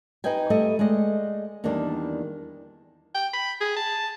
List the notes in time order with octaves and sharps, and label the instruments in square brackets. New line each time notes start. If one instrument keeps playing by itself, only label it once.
[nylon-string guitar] D#4 G4 B4 D#5 G5 G#5
G3 A3 A4 D#5 E5
G#3 A3 D5 D#5
E2 D#3 G3 A#3 D4
[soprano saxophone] G5
B5
G#4
A5